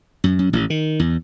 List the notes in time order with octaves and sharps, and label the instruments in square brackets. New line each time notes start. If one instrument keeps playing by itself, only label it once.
[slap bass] F#2
F#2
A1
D#3
E2